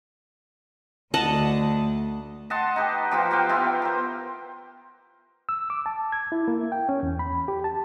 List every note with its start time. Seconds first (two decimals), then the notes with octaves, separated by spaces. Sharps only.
1.14 D2 D#5 F#5 A5
2.50 D#5 F#5 A5 C6
2.76 D#4 G4 B4
3.11 F3 B3 F4 G4
3.31 F#4 G4 F5 G5
3.49 B3 E4 F4 G4
3.82 A#4 C5
5.49 E6
5.70 D6
5.86 A5
6.12 G#6
6.32 E4
6.48 A#3
6.72 G5
6.89 C#4
7.03 E2
7.19 B5
7.48 G4
7.64 A5